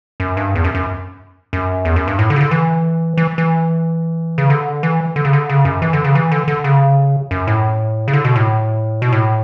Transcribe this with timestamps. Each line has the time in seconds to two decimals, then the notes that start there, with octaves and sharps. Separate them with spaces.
0.20 F#2
0.37 G2
0.55 E2
0.64 F#2
0.75 F#2
1.53 F#2
1.85 E2
1.96 F#2
2.08 G2
2.19 A2
2.30 D3
2.36 C#3
2.41 D3
2.51 E3
3.17 E3
3.38 E3
4.38 C#3
4.50 D3
4.83 E3
5.16 D3
5.25 C#3
5.33 D3
5.49 C#3
5.65 F#2
5.82 E3
5.93 D3
6.04 C#3
6.15 E3
6.32 D3
6.48 D3
6.64 C#3
7.31 F#2
7.47 A2
8.08 C#3
8.13 D3
8.24 B2
8.36 A2
9.02 B2
9.12 A2